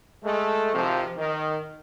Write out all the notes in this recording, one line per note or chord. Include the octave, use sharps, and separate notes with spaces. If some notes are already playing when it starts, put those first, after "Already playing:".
G#3 A3
G#1 C3 F3
D#3